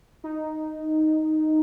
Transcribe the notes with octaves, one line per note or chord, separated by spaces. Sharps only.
D#4